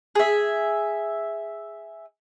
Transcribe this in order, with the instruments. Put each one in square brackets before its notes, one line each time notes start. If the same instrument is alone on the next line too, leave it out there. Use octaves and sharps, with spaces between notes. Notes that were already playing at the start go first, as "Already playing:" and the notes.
[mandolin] G#4 E5